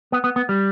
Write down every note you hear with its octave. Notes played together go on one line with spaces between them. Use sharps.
B3
B3
B3
G3